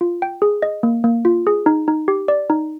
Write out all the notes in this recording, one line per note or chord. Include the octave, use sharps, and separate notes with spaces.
F4
G5
G#4
D#5
A#3
A#3
F4
G#4
D#4
D#4
G4
D5
D#4